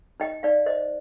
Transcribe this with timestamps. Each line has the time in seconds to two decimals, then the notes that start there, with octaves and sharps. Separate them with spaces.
0.20 D#4 D#5 G5
0.43 D#4 D5 F5
0.66 C5 D#5